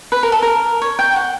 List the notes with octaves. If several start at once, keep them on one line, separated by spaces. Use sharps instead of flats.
B4
A#4
A4
A#4
C#5
G5
F#5